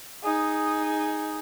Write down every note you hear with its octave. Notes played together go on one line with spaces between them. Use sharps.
D#4 G#4